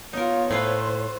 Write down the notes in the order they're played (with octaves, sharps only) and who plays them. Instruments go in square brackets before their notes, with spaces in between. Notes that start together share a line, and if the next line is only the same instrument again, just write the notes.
[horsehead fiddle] B3 F4 [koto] D#4 A#4 [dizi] C#5
[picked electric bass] A2 [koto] A3 F4 B4 [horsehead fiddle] C5